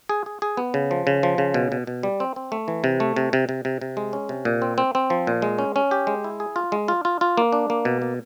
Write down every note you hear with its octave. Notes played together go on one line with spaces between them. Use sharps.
G#4
G#4
G#4
B3
C#3
F3
C#3
F3
C#3
B2
B2
B2
G3
C4
C4
A3
E3
C3
A3
C3
C3
C3
C3
C3
G#3
C#4
C3
A#2
C4
C4
C4
F3
A#2
G#3
C#4
C#4
G4
G#3
E4
G#4
F4
G#3
F4
F4
F4
A#3
D4
A#3
B2
A#3